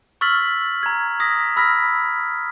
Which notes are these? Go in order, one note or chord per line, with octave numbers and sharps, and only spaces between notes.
C#6 E6 F6 A6 B6 F#7
A#5 G#6
D#6 A#6 B6
B5 E6 F6 A#6 B6